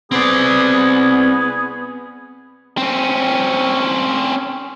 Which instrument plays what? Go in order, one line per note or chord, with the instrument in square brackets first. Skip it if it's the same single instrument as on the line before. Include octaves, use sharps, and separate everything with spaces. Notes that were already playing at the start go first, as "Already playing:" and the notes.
[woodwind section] B3 G#4 [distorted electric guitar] C4 D5
[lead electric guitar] C4 C#4